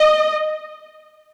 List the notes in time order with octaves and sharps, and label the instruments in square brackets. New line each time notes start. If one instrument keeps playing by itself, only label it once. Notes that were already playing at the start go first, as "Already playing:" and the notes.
Already playing: [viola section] D#5